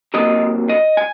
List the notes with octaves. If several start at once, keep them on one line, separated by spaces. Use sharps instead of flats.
C3 F#3 A#3 D#5
D#5
G#5